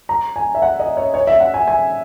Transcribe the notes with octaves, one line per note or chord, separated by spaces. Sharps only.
A#5
G#5
E5
F#5
D#5
C#5
C#5
E5
F#5
G#5
G#5